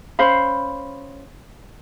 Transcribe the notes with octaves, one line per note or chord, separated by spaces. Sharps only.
C#4 C5 F5 B5